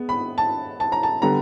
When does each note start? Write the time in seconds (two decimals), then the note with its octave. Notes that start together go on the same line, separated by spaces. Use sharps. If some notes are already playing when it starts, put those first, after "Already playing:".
Already playing: G#3 B3
0.09 B5
0.38 A5
0.80 A5
0.92 A#5
1.03 A5
1.22 D3 G3 B3 A#5